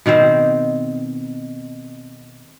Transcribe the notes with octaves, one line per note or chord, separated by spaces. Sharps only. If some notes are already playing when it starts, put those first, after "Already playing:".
B2 D#3 C4 C5